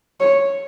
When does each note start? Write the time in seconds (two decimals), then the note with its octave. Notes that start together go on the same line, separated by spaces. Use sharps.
0.20 C#5